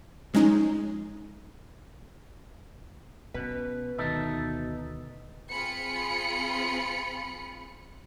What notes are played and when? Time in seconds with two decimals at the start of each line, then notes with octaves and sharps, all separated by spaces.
0.34 F3 G#3 C#4 D#4
3.34 B2 C#4 B4
3.98 D2 B2 D#3 D#4 A4 E5
5.50 C4 F4 G#4 B5 C#7